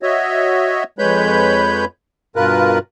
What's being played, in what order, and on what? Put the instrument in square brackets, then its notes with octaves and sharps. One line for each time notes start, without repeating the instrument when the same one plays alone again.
[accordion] F#4 C#5 D#5 E5
F2 G#3 B4 C#5 B5 G6
G2 B2 F4 A#4 B4 F#6